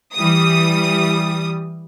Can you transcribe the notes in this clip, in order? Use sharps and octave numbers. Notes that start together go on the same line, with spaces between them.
E3 G3 D#6